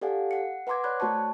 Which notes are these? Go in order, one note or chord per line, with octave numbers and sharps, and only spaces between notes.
G4 A4 D5 F5 F#5 G#5
F#5 C#7
B4 F#5 A#5 C6 D6 G#6
C#5 D5 B5 F#6 G#6
A3 F#4 C5 D5 A5 C#6